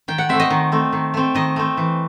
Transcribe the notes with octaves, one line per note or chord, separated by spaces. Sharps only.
D#3 G5
F#5
A3 C4 E5
D#5
D#3
A3 C4
D#3
A3 C4
D#3 D#5
A3 C4
E3